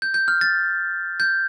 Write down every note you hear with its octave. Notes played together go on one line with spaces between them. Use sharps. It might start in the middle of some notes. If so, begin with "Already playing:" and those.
G6
G6
F6
A6
G6